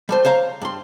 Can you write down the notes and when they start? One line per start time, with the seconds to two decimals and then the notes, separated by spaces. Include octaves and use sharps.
0.09 G3 A3 C5
0.25 C5 C#5 F5 A#5
0.62 G2 C6